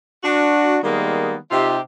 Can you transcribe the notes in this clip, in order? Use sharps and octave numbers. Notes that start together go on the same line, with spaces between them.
D4 F#4
D#3 G3 G#3 A#3 B3
C3 D#4 F4 G4 E5